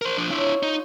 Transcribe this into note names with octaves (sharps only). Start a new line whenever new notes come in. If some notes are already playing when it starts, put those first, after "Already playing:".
A#4 C5
F3 D4
D4 E4 F4 C#5 A5
D#4